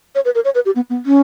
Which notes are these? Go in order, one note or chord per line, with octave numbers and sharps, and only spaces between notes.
C#5
B4
A#4
C#5
B4
G4
B3
B3
C#4